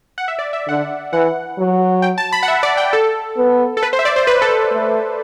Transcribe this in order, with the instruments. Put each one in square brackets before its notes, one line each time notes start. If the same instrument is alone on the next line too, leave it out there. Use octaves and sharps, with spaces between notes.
[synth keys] F#5
E5
D5
E5
[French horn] D3 [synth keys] F#5
[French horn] E3 [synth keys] F#5
[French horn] F#3
[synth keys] G5
A5
B5
F#5
E5
D5
G5
A4
[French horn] B3
[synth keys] A4
B4
C5
E5
D5
C5
B4
A4
[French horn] A3